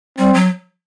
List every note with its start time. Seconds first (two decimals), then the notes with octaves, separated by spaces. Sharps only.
0.18 G3 C4
0.34 F#3